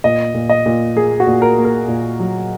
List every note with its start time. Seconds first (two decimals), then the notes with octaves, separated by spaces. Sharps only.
0.04 A#2 D#5
0.34 A#2
0.49 D#5
0.66 A#2
0.96 A#3 G#4
1.20 F#4
1.27 A#2
1.42 A#4
1.58 A#3
1.65 A#4
1.88 A#2
2.20 F#3